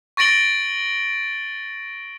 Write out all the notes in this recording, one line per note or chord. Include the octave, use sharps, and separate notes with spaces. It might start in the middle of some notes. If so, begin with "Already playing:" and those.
C#6 A6 A#6 D7 F#7 G7